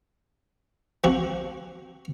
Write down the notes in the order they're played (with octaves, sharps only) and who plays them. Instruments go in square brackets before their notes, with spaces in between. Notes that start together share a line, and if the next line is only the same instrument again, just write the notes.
[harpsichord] F3 C4 F#4